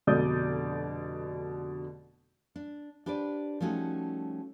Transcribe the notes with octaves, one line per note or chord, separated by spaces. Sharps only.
F1 B2 D3 D5 D#6 G6
D4
D4 G4 B4 C5 D5
F3 G3 A3 C#4 D#4 F#4